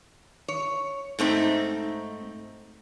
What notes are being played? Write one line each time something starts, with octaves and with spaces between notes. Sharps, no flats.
C#5
G#2 A3 C4 D#4